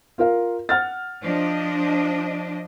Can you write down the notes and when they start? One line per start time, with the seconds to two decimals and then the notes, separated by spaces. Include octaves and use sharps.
0.18 F4 A#4 F5
0.69 F#5 F6 A6
1.23 F3 D4 D#5